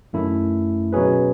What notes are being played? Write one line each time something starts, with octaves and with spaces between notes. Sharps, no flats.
F#2 D#3 A3 C#4 E4
B2 F#3 C#4 G#4 B4